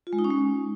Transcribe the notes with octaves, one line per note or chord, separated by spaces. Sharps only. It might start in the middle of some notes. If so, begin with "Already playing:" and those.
F4
G#3
D#4
C#4
G#3